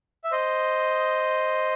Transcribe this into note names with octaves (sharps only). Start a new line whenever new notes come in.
E5
C5 D#5